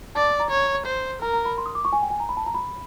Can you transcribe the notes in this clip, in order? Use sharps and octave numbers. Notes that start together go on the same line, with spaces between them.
D5 A5
A#5
C#5
C5
A#4 A#5
A#5
B5
C6
D#6
D6
C#6
G#5
G5
G#5
A#5
B5
A5
A#5
B5